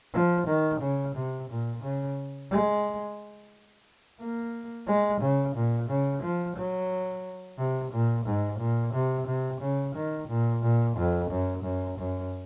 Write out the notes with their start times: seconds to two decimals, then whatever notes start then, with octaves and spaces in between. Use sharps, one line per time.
0.14 F3
0.48 D#3
0.81 C#3
1.16 C3
1.50 A#2
1.83 C#3
2.51 G#3
4.21 A#3
4.87 G#3
5.21 C#3
5.56 A#2
5.90 C#3
6.23 F3
6.57 F#3
7.58 C3
7.92 A#2
8.26 G#2
8.60 A#2
8.94 C3
9.27 C3
9.61 C#3
9.96 D#3
10.29 A#2
10.63 A#2
10.97 F2
11.31 F#2
11.64 F#2
11.99 F#2